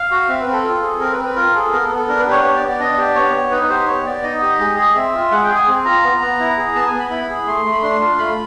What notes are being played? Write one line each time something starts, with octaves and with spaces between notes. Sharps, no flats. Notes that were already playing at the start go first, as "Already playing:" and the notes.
Already playing: F5
F#4
C4 E5
B4
C4
A4
F4
G#4
C4 A#4
B4
C4
B4
F4 A#4
G#4 A4
B3 A#4
A4
B3
A4
D4 A#4
B4
G4
C#5
B3 C#5
D5
B3
D5
D4 D#5
G4 D5
B3 C#5
B3
D#4 B4
B4
G4 C5
B3 C#5
B3 D5
D#4 D#5
G4
G#3
G#4
C4 E5
F4
G#3 F#5
G5
G#4
G#5
C4
F4 A#5
B3
B3
E4
G#4
B3 A5
G#5
B3
B5
E4 B5
G#4
A3 C6
A3
B5
D4 C6
F4
A3 B5